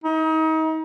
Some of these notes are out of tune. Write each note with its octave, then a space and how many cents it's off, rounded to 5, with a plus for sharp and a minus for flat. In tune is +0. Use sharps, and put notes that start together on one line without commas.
D#4 +35